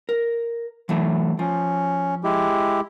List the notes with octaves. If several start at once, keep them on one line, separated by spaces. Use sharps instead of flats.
A#4
E3 F#3 A3
F3 C#4
G#3 E4 G4